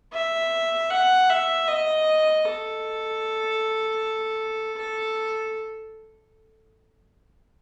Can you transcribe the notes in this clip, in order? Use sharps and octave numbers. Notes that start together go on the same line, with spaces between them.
E5
F#5
E5
D#5
A4
A4